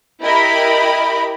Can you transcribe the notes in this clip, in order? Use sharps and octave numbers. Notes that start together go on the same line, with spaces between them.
E4 G4 A#4 D#5 B5